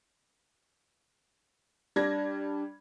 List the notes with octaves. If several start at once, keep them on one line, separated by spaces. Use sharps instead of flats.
G3 D4 G#6 A#6